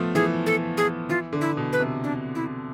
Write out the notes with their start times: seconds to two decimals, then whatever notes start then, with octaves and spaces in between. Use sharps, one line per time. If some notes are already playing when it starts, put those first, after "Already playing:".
Already playing: F3 A3 B3
0.15 E3 G#4
0.46 A4
0.77 G#4
1.09 E3 F4
1.33 D3
1.41 E4
1.57 B2
1.73 B4
1.80 C3
2.04 D4
2.35 E4